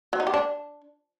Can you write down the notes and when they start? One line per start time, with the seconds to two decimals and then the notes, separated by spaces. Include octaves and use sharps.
0.13 F#3
0.20 D#4
0.27 G4
0.34 D4